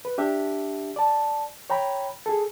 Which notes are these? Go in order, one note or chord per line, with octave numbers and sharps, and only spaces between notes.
B4
D4 G4 E5
D5 A5
C#5 G5 A#5 B5
G#4 A4